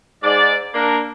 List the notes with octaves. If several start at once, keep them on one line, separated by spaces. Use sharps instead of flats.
G#2 D5
A#3 D4 A#4